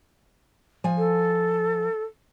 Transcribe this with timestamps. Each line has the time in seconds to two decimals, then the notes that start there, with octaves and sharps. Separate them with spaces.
0.84 F3 G#5
0.98 A4